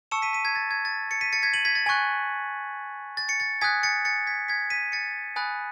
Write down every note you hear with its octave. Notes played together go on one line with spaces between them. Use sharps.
A5 C#6 E6 C#7 E7
B6 D#7
B6 D#7
G#6 B6
A6
G#6
A6
A6 C#7
B6 D#7
A6 C#7
G#6 B6
D#7 F#7
G#6 B6
A6
G#5 C#6 F#6 G#6
A6
A6 C#7
A6
G#5 D#6 F#6 G#6 B6
A6 C#7
A6 C#7
G#6 B6
G#6 B6
B6 D#7
A6 C#7
G#5 B5 D#6 F#6 A6